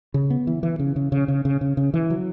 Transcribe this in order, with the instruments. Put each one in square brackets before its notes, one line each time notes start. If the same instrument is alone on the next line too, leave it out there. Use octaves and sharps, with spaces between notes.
[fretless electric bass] C#3
B3
E3
E3
C#3
C#3
C#3
C#3
C#3
C#3
C#3
E3
F#3